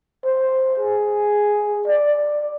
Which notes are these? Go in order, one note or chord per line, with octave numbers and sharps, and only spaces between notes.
C5
G#4
D5